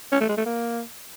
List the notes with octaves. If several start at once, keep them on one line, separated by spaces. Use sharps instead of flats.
C#4
A3
G#3
A3
A#3